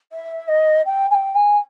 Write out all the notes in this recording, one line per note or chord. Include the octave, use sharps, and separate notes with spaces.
E5
D#5
G5
G#5
G5
G#5